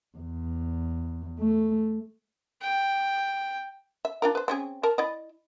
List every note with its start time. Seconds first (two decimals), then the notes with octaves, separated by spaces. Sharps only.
0.17 E2
1.39 A3
2.62 G5
4.05 E5
4.22 D4 F4 A#4
4.35 B4 C5
4.48 C4 C#4 G#4
4.83 A#4 A5
4.98 E4 D5 D#5